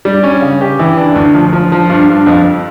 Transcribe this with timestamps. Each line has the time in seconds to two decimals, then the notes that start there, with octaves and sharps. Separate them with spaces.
0.05 G3
0.23 C#4
0.42 C#3
0.61 G4
0.79 E3
0.97 D4
1.15 D2
1.34 F3
1.53 F3
1.72 F3
1.89 G2
2.09 G2
2.26 F2